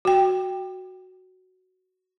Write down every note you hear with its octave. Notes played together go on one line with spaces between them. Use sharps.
F#4 G5